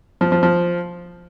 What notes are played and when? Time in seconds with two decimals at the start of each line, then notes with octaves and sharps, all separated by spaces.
0.21 F3
0.32 F3
0.43 F3